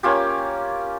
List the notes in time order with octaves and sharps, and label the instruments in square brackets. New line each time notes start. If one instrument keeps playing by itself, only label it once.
[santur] A#3 C#4 F4 G4